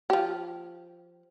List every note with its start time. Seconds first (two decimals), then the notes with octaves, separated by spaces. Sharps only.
0.10 F3 G4